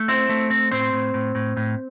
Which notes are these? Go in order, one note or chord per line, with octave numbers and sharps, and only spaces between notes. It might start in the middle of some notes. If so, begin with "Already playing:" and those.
Already playing: A3
C4 E4 C5
A3
C4
A2 C4 C5
A2
A2
A2
A2